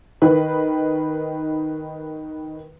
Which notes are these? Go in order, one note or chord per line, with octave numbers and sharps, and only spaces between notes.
D#3 B4